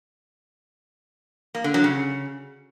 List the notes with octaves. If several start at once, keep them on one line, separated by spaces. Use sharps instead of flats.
A#3
D3
F#3
C#3